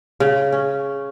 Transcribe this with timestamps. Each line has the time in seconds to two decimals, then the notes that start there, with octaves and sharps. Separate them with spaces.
0.20 C#3
0.52 C#4